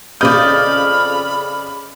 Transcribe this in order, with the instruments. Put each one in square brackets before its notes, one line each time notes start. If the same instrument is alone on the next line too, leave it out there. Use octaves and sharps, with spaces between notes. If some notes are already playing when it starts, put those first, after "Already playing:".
[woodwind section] F2 F6 [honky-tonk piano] C#3 G6 [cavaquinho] D5 D#5 [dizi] B5